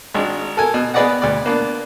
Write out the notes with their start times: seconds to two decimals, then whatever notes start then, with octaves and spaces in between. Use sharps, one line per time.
0.14 G#1 G#3 D4
0.57 A4 A#4 G#5
0.74 B2
0.94 B3 G#4 B4 D5 D#5 F#5
1.22 D2 D5
1.46 A#3 B3 D4